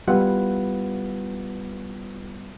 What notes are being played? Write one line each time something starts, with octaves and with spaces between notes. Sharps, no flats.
G3 B3 E4 F4 B4 F#5